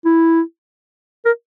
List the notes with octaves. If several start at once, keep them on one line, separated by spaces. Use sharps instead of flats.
E4
A#4